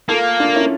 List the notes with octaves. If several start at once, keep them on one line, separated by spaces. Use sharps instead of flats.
A#3 F4 A4
D4 F4
C#4 E4